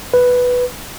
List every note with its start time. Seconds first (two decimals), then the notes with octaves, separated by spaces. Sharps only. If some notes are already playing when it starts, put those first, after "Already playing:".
0.14 B4